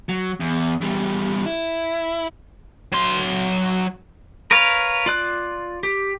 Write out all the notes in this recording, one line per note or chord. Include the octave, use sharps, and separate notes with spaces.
F#3
E2
E2 G3
E4
F#3 C6
A#4 B4 C#5 F5
F4 D5 F#6
G4